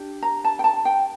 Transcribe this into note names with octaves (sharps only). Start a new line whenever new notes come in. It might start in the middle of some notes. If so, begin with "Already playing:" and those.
Already playing: D4 G4
A#5
A5
G5
A5
G5